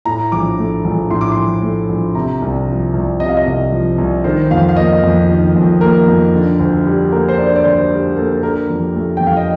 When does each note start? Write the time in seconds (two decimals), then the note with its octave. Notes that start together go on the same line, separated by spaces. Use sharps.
0.05 A2 A#5
0.32 A#1 D6
0.59 A3
0.85 A#1
1.10 A2 C6
1.21 D6
1.32 C6
1.37 A#1
1.62 A3
1.89 A#1
2.15 C3 A#5
2.42 C2
2.68 F3
2.93 C2
3.20 C3 D#5
3.29 F5
3.37 D#5
3.46 C2
3.72 F3
3.98 C2
4.24 D#3 C5
4.51 F2 F5
4.69 F5
4.77 A#3 D#5
5.04 F2
5.29 D#3
5.56 F2
5.81 A#3 A#4
6.07 F2
6.34 D3
6.59 D2
6.86 G3
7.12 A#3 A#4
7.29 C5
7.38 D3 D5
7.56 D5
7.64 D2 C5
7.91 G3
8.16 A#3 A4
8.43 D3 A#4
8.70 F2
8.96 A3
9.17 F2 G5
9.27 F5
9.37 D#5